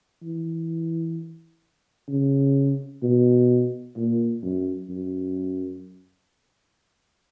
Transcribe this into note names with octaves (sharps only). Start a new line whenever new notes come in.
E3
C#3
B2
A#2
F#2
F#2